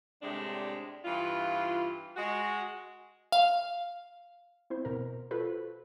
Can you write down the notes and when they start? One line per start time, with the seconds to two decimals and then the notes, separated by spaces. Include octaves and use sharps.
0.22 A2 C3 G3 G#3 D4
1.05 G2 E3 F4
2.17 G#3 F#4
3.32 F5
4.70 C4 E4 C5
4.85 B2 A#4
5.31 F4 F#4 A4 B4 C5